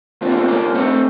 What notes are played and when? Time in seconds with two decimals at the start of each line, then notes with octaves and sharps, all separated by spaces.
0.21 C2 A#2 F3 C4
0.29 A#3
0.37 A3 C4
0.48 A#3 C#4
0.74 A3 C4